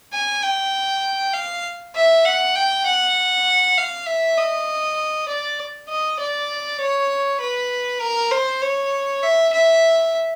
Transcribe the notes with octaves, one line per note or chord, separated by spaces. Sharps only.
G#5
G5
F5
E5
F#5
G5
F#5
F5
E5
D#5
D5
D#5
D5
C#5
B4
A#4
C5
C#5
E5
E5